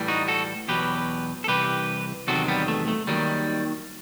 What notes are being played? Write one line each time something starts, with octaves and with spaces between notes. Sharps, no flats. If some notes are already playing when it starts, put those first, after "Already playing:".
Already playing: A2 E3 G3
D#4 F#4
F#4 A4
E2 B2 F#3 G4 B4
A4
C2 C3 E3 G4 B4
E2 C3 D#3 F#3 F#4 A4
G3 B3
A3
A3
D#2 D#3 F#3 G3